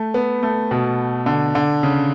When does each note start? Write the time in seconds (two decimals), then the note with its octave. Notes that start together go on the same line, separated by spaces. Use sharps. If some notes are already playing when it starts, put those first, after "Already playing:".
Already playing: A3
0.14 B3
0.43 A3
0.71 B2
1.26 D3
1.55 D3
1.83 C#3